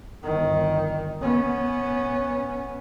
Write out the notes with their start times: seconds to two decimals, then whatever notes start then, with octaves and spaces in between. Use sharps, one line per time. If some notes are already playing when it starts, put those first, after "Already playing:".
0.23 G1 D#3
1.21 B3 C#4